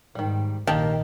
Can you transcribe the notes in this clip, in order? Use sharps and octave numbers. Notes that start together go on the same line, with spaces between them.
G#2 D#3 G3
A#1 D#3 A#3 G4 A5